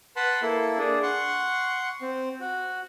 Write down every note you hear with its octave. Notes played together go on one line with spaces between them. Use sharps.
B4 F#5 A5 B5 C6
A#3 E4 A4
D4 G#4
F#5 C6 C#6
C4
F#4